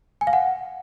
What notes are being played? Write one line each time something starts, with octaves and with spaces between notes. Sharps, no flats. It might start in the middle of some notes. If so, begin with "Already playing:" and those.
G#5
F5
F#5